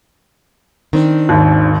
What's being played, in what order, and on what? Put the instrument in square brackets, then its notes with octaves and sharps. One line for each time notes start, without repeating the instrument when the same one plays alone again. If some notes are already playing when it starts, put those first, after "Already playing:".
[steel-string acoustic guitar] D#3 C4 D4
[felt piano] G#1 D#2